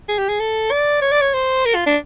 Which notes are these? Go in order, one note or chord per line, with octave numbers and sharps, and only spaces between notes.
G#4
G4
G#4
A4
D5
C#5
D5
C#5
C5
A#4
F4
D4